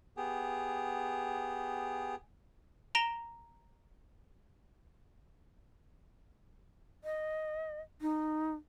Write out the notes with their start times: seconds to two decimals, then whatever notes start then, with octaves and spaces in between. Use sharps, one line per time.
0.17 B3 G4 G#4
2.95 A#5 A#6 D7 E7 F7 G7
7.04 D#5
8.01 D#4